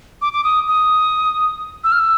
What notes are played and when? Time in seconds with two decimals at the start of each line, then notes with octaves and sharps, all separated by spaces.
0.22 D6
0.33 D6
0.44 D#6
0.68 D#6
1.84 E6
1.92 F6
2.00 E6